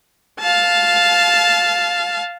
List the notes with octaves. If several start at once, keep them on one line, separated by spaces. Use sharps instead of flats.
F5 A5